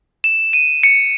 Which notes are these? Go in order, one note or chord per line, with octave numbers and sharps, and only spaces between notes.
E7
D#7
C#7